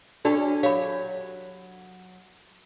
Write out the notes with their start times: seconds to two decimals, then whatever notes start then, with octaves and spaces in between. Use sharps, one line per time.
0.25 C#4 D4 F#4 G4 A4 D5
0.63 F#3 G4 C#5 F5 B5